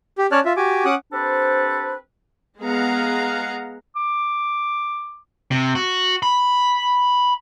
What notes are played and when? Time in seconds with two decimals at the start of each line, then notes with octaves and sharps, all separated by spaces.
0.18 G4
0.32 C#4 C#5 D5 A5 F6 F#6
0.45 F4 E5
0.57 F#4 G4 G#5 D6
0.85 C#4 F#5 D6 D#6 F#6
1.12 C4 D4 G4 A4 B4 C5
2.60 G#3 B3 G#4 F5 F#5 A#5
3.96 D6
5.51 C3
5.75 F#4
6.23 B5